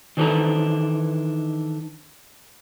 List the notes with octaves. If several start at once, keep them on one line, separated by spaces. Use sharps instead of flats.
D#3 E3 D4 A4 C5 A#5